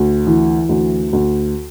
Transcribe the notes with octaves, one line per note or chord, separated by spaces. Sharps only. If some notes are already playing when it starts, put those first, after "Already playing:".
Already playing: D2
E3
D2
D2